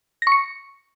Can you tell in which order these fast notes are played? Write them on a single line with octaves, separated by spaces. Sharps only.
A#6 C#6 C#7